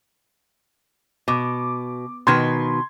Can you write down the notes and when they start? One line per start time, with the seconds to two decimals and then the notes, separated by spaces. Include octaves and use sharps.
1.28 B2 D6
2.27 B2 D#3 B4 C6 G#6